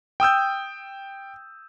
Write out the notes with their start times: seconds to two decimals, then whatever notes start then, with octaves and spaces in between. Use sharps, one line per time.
0.20 G5 D#6 E6 G6